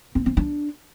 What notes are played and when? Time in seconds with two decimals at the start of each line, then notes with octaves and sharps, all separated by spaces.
0.15 C4
0.26 C4
0.37 D4